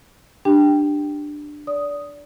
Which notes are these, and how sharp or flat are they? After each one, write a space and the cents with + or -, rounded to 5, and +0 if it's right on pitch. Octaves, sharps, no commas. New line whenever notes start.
D4 +10 G4 +0 G5 +0
D5 -25 D#6 +0